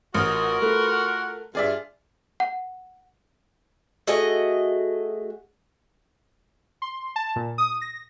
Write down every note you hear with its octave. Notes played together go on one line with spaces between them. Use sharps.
A1 F4 F#4 A#4 D#5 F6
A3 B4
F#5
G2 F4 G#4 D5 E5
F#5
A3 F#4 G#4 D#5
C6
A5
A#2
D#6
A#6